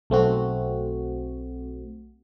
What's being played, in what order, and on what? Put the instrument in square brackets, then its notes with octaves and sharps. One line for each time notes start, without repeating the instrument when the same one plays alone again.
[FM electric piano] B1 A3 C4 F#4